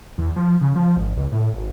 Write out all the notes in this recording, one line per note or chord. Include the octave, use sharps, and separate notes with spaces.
E2
F3
C#3
F3
G#1
C#2
A2
G#1